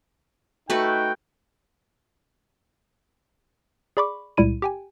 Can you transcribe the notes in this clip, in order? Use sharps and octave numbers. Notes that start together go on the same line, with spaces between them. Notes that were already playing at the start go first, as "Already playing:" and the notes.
A3 D#4 F#4 B4 G5
G#4 D5 B5 C#6 D6
C#2 A#2 G3 E4 D#7
G4 G5 G#5